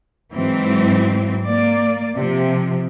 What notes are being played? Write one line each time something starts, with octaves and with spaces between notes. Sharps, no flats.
G#2 E3 F#3 C4
A#3 D5
C3 F3